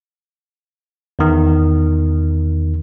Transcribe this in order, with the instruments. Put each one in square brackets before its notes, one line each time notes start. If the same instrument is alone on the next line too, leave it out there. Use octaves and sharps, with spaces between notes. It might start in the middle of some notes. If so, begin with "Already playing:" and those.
[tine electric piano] E2 D#3